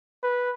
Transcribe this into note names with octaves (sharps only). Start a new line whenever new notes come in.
B4